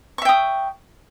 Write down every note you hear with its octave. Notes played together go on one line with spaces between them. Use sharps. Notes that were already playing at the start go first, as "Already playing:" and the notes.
E5 G5 C#6 D#6